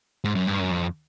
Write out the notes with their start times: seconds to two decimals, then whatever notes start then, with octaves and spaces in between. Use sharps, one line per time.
0.24 G#2
0.35 F#2
0.47 G2
0.60 F#2
0.71 F2